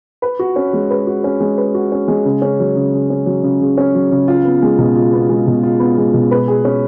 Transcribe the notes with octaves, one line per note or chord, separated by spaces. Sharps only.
B4
F#4
C#4
G#3
B4
F#4
C#4
G#3
B4
F#4
C#4
G#3
C#3
C#4
F#3
C#3
C#3
C#4
F#3
C#3
C#3
C#4
F#3
C#3
F4
B3
G#3
B2
F4
B3
G#3
B2
F4
B3
G#3
B2
B4
G#4
C#4